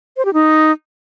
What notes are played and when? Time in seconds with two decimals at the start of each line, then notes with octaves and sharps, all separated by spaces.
0.17 C5
0.25 G4
0.33 D#4